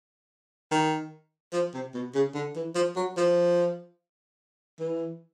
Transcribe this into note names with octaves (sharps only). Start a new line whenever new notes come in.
D#3
F3
C3
B2
C#3
D3
E3
F3
F#3
F3
E3